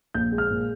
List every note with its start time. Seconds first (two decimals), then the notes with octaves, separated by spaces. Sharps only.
0.14 A#1 G6
0.32 G#3
0.38 F6
0.50 A#2